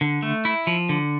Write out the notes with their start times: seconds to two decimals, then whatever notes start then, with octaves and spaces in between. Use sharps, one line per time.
0.01 D3
0.23 A3
0.45 E4
0.67 F3
0.89 D3